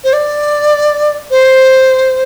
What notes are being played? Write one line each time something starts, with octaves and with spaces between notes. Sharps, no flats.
C5
D5
C5